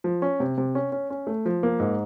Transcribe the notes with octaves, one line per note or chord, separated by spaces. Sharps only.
F3
C#4
C3
C3
C#4
C#4
C#4
A3
F3
A#3
G#2